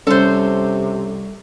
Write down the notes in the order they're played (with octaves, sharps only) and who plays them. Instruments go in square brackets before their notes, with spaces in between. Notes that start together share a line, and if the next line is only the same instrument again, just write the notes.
[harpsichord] C2 [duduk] C3 [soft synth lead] C#4 [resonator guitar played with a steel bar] A4 C5